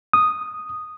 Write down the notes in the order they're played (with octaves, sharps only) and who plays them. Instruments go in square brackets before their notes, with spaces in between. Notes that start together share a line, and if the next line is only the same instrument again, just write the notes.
[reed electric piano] D#6